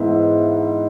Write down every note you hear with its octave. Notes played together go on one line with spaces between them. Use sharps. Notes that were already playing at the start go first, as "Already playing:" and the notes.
Already playing: G#2 E3 B3 E5